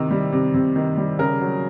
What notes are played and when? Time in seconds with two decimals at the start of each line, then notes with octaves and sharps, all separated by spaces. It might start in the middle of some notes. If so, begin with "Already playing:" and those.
Already playing: C3 D#3
0.11 G3
0.32 C3
0.54 C3
0.76 D#3
0.97 G3
1.19 C#3 A#4
1.41 F#3